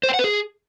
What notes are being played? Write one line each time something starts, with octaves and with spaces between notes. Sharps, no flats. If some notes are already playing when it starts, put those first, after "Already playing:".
C5
G5
F#5
B4
G#4